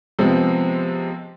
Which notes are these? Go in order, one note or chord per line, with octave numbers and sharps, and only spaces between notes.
C3 F3 G#3 B3 C4